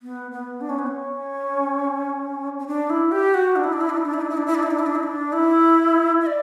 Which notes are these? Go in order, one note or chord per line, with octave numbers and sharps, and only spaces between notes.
B3
B3
D4
C#4
B3
C#4
C#4
D4
E4
G4
F#4
D4
E4
D4
E4
D4
E4
D4
E4
D4
E4
D4
E4
D4
E4
D4
E4
D4
E4
D4
E4
E5
D5